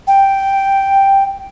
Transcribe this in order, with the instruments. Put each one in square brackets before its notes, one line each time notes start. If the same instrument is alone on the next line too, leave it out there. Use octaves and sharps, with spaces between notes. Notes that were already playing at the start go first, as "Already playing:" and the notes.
[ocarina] G5